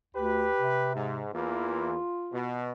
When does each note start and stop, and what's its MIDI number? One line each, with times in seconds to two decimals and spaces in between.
0.15 0.47 38
0.15 0.89 67
0.15 0.89 71
0.59 1.24 48
0.94 1.31 44
1.33 1.95 40
1.33 1.95 52
1.33 1.95 58
1.33 2.62 65
2.32 2.72 47